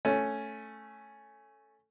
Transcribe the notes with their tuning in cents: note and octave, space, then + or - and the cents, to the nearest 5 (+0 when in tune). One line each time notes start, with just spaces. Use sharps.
A3 +0 C#4 +0